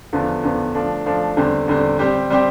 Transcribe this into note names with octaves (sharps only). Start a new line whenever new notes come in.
E2 D3 F3 B3
E2 D3 F3 B3
F3 A3 D4
F3 A3 D4
E2 D3 G3 C4
E2 D3 G3 C4
G3 C4 G4
G3 C4 G4